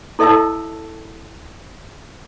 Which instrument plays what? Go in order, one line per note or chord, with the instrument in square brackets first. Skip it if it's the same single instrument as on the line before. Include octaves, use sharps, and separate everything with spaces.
[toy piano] E4 A4 D#5 E5 A5 E6